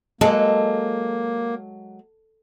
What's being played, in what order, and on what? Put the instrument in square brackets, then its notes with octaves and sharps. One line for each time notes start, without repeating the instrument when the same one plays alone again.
[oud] F#3 G#3 [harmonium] A#3 [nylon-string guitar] A4